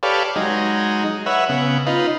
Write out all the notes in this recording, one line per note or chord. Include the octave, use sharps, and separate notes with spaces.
G4 A4 B4 C#5 D5 F5
F#3 G#3 D#4
B4 C#5 E5 F#5
C#3 B3
D#4 F4 B4